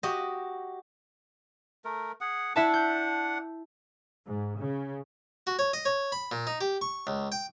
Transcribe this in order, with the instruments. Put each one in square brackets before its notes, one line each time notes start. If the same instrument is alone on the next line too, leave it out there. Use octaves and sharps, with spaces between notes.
[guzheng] F#4 G4 D#5
[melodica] A3 A#4
G#4 F#5
[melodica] D4 F#5 [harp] E4 E5 A5
[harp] G6
[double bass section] G#2
C#3
[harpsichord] F#4
C#5
D#5
C#5
B5
A#2
D#4
G4
C#6
C#2
G5